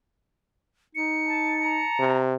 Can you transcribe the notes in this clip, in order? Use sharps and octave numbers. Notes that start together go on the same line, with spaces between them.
D#4 C#7
A5
A5 A#5
C3